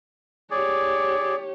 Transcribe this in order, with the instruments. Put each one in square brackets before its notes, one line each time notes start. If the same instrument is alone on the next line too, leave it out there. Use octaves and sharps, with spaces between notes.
[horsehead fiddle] G4 C#5 [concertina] G#4 D5